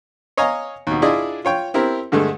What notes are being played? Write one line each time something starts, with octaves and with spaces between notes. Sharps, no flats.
C#5 D#5 F5 G#5 A#5
D#2 B2
D4 E4 F4 G#4 D5 D#5
F4 C#5 G5
C4 E4 G4 A#4
G2 D3 G#3 A3